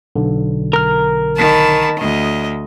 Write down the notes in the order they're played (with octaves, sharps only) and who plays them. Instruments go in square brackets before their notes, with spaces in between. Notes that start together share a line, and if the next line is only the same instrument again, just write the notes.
[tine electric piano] B1 D3
[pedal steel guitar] A#4 F6
[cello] D#3 [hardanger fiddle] A5 B5
[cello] D2 [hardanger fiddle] D#5